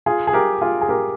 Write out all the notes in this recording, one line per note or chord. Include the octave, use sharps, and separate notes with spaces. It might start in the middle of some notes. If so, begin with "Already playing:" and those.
F4 G#4
G#4
G4 A#4
F4 G#4
G#4
G4 A#4